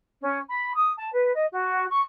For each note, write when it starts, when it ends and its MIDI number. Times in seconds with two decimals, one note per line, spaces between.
0.22 0.38 61
0.48 0.72 83
0.75 0.91 87
0.97 1.09 81
1.11 1.32 71
1.33 1.45 75
1.52 1.85 66
1.90 2.00 85